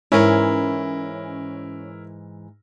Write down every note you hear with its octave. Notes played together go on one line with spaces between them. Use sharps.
G#2 E3 C#4 E4 A#4